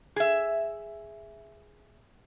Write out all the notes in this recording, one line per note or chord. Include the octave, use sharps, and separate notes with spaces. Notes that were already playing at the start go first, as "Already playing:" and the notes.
G#4 E5